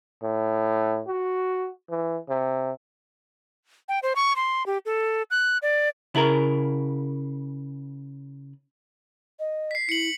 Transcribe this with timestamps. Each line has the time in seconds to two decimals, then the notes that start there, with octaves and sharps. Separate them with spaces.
0.23 A2
1.08 F#4
1.90 E3
2.29 C3
3.88 G5
4.03 C5
4.15 C#6
4.36 C6
4.66 G4
4.85 A4
5.31 F#6
5.62 D5
6.15 C#3 E4 G#4 A#4
9.39 D#5
9.71 B6 C7
9.89 E4 C#7 F#7